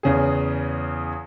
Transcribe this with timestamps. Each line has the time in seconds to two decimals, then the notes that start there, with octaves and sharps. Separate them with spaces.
0.03 E2 C#3 G#4